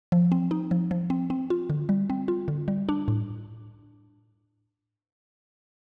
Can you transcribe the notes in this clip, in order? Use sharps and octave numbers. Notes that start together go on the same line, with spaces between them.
F3
C4
D#4
F3
F3
C4
C4
F4
D3
G3
C4
F4
D3
G3
D4
A2